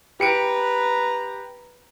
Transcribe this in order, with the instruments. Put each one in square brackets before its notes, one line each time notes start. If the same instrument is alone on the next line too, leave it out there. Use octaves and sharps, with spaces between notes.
[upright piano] G4 C#7 D7 [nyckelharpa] B4 A#5